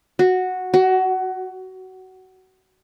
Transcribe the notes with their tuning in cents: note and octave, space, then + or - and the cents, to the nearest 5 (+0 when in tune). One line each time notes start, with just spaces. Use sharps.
F#4 -5
F#4 +20